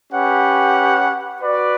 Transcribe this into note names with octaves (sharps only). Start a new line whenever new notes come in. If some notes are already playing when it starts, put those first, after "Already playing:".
C#4 G4 B4 F#5
F#4 B4 D5